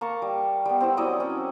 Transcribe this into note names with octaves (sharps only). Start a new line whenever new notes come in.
A#3 A5 A#5 C#6
G3
G3 B3
C4 E4 E6
F#3 E4 D5 D#5
C#4